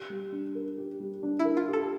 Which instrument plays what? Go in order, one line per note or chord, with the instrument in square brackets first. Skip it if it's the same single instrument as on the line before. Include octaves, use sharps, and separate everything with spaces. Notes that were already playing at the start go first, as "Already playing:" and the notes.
Already playing: [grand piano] G4
G3
D4
A#4
G4
G3
D4
[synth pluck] E4
[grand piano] A#4
[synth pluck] F4
[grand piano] G4
[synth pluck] A4